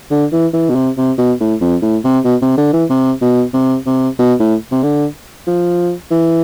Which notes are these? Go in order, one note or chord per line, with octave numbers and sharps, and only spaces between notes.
D3
E3
E3
B2
C3
C3
B2
A2
F2
A2
C3
B2
C3
D3
E3
C3
B2
C3
C3
B2
A2
C3
D3
F3
E3